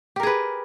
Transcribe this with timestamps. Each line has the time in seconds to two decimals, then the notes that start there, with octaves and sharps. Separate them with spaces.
0.16 G4
0.20 A#4
0.23 G#4
0.27 B4